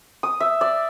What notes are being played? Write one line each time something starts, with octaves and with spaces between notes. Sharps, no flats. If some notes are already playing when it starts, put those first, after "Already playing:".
D#6
E5
D5